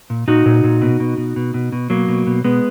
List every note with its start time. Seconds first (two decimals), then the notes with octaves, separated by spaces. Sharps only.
0.10 A#2
0.28 A#2 D#4 F#4
0.46 A#2
0.64 A#2
0.82 B2
1.00 B2
1.17 B2
1.36 B2
1.54 B2
1.72 B2
1.90 B2 F#3 A#3
2.08 B2
2.27 B2
2.44 B2 G#3 B3